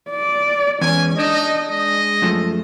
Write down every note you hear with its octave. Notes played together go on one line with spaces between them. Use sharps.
D5
E2 G#3 C#4 G#5
D4 D#4 D#5
G#3 D#5
F#2 F3 A3